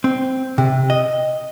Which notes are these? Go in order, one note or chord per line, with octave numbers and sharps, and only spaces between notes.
C4
C3
D#5